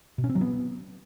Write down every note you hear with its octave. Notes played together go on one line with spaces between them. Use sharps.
B2
C#4
C4
F#3
B3